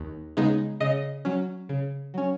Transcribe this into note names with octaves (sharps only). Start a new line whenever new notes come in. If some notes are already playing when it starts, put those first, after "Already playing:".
Already playing: D#2
C#3 G#3 B3 D#4
C#3 D#5
F#3 C#4
C#3
F#3 C#4